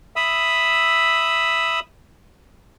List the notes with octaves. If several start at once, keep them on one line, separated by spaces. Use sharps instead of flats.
E5 B5 D#6 E6